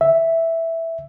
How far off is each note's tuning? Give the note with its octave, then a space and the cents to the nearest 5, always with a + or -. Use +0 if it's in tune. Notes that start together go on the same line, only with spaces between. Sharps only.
E5 +0